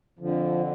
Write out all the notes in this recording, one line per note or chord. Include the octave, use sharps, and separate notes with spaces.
F2 D3 F3